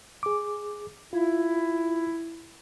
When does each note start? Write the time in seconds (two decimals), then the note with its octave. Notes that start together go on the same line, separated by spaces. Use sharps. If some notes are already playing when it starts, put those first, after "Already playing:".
0.23 G#4 D6
1.13 E4 F4